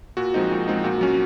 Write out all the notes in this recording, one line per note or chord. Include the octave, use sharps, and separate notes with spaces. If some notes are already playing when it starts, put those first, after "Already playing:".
A#2 F#4
F3 G#3 C4 D#4
A#2
F3 G#3 C4 D#4
A#2 F#4
F#3 C#4